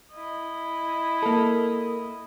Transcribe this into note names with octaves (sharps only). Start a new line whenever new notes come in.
E4 D#5
A#3 A4